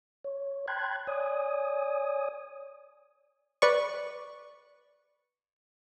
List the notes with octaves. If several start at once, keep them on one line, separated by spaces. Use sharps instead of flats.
C#5
G5 A5 B5 C6 F#6 G#6
C#5 D5 G#5 D#6
B4 D5 C#6